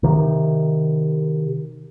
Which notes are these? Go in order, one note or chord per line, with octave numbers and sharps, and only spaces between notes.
C3 D#3